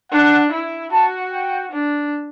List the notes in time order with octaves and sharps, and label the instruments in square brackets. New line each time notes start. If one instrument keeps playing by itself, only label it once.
[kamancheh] D4 [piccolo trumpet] F#5
[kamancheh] E4
[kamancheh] F#4 [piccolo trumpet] A5
[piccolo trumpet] G5
[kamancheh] D4